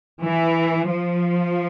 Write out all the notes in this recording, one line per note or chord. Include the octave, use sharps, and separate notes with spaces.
E3
F3